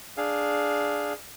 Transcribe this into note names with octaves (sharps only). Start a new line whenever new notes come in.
D4 G#4 F5